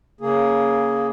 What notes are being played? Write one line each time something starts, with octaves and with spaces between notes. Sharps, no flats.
C#3 A#3 G#4